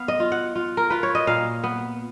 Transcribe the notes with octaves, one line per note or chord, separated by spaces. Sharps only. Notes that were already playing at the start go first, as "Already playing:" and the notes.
Already playing: B3 F5
D#5
F4
F#5
F4
A#4
F4 B4
C#5
D#5
A#2 F5
B3